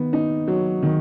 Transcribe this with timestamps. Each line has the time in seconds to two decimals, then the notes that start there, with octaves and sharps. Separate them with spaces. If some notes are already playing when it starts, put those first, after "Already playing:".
Already playing: D#3 B3
0.13 D#4
0.47 F#3
0.83 D#3